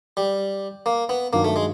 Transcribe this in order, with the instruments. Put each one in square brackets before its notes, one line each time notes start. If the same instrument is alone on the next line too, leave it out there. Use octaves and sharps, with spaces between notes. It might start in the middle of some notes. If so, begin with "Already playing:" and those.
[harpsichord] G3
A#3
B3
[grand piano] G2 D#3 F#3 [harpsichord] A#3
[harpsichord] A3
G#3